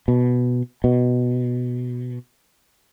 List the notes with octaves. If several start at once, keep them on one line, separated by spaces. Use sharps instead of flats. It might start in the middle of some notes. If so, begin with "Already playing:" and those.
B2
B2